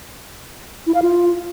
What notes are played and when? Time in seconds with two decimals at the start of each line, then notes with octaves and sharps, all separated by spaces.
0.87 E4
0.94 F5
1.02 F4